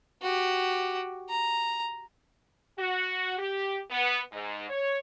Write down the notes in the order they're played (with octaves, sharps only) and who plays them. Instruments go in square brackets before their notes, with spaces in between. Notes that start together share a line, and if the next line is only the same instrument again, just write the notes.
[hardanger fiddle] F#4 G4
A#5
[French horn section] F#4
G4
B3
G#2
C#5